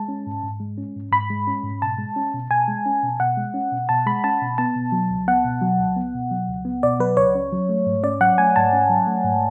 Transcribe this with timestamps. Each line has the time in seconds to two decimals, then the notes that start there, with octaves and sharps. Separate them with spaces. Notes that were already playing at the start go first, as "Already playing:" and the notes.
Already playing: G#3 A5
0.08 C#4
0.27 G#2
0.43 G#2
0.60 G#3
0.78 C#4
0.96 G#2
1.12 G#2 B5
1.30 G#3
1.47 C#4
1.64 G#2
1.82 B2 A5
1.98 G#3
2.16 C#4
2.34 B2
2.50 B2 G#5
2.68 G#3
2.86 C#4
3.03 B2
3.20 B2 F#5
3.37 G#3
3.54 C#4
3.72 B2
3.89 B2 A5
4.06 G#3 B5
4.24 C#4 A5
4.42 B2
4.58 B3 A5
4.76 B2
4.92 F#3
5.10 C#2
5.27 B3 F#5
5.45 B2
5.62 F#3
5.80 C#2
5.97 B3
6.14 B2
6.31 F#3
6.48 C#2
6.65 B3
6.83 B2 D5
7.00 F#3 B4
7.17 C#2 C#5
7.35 C#4
7.52 F#3
7.69 A3
7.86 G#2
8.03 C#4 D5
8.21 F#3 F#5
8.38 A3 G#5
8.56 G#2 A5
8.73 C#4
8.90 F#3
9.07 A3
9.24 G#2